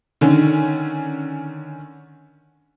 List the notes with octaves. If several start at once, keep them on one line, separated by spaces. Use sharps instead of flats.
D3 D#3 C#4